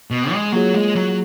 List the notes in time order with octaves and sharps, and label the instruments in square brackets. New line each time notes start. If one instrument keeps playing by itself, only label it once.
[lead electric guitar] B2
G#3
[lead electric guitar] F#3 [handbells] A#3 F4 G#4 C#5
[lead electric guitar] G#3
F#3